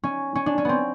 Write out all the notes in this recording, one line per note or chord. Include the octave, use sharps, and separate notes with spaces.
C#4
C#4
D4
C#4
B3 C4